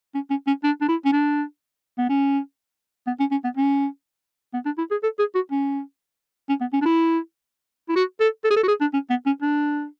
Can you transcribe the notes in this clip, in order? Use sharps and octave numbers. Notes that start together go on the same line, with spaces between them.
C#4
C#4
C#4
D4
D4
E4
C#4
D4
B3
C#4
B3
C#4
C#4
B3
C#4
B3
D4
E4
G#4
A4
G#4
F#4
C#4
C#4
B3
C#4
D4
E4
E4
F#4
A4
A4
G#4
A4
F#4
G#4
D4
C#4
B3
C#4
D4